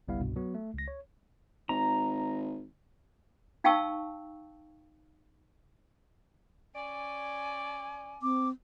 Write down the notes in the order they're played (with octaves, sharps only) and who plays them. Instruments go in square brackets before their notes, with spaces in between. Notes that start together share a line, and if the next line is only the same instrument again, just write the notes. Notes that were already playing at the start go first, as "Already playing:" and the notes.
[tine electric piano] G1 C2 G3 B3 E4 F5
C2 G2 B2
F#3 B3 F#4
A3
C#2 A#6
C#5
[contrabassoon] G#1 [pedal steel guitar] A#5
[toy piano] D#4 F5 G5 A5 C#6 E6
[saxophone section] C#4 D5 [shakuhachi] G#5
[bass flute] C4 [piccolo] D6